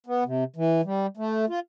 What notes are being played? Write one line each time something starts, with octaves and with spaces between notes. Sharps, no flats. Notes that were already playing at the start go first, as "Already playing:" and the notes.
B3
C3
E3
G3
A3
F4